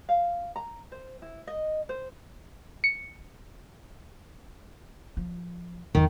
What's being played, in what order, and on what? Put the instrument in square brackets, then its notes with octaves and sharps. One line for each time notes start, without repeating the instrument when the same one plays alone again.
[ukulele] F5
A#5
C5
E4
D#5
C5
[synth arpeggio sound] C#7
[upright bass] F3
[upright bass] E2 B3 [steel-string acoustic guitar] D#3